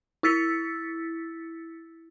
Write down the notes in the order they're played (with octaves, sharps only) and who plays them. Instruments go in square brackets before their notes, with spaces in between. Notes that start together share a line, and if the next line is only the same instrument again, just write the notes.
[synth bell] E4 E6 A6 B6 C#7